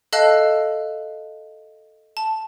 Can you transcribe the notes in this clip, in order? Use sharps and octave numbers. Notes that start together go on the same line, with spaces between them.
A4 D#5 F5 A5 F#6 C7
A5